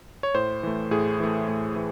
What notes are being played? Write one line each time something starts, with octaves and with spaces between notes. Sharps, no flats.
C#5
A2 C5
E3 A3
A2 G#4
E3 A3
A2
E3